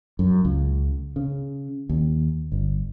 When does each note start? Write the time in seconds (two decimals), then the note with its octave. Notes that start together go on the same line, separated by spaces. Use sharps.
0.19 F#2
0.45 C#2
1.16 C#3
1.89 D#2
2.52 G1